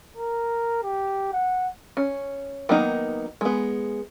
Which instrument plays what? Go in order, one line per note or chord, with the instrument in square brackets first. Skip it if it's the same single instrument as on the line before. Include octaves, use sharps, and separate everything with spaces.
[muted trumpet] A#4
G4
F#5
[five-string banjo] C#4
D#3 F#3 A#3 B3 D#4
G#3 B3